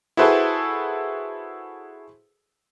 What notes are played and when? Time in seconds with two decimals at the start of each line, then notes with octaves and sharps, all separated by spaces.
0.17 E4 F#4 G#4 A4 B4 C5